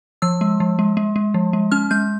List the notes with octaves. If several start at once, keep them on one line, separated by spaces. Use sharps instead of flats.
F3 E6
G#3
F3
G#3
G#3
G#3
F3
G#3
C#4 F6
G#3 G6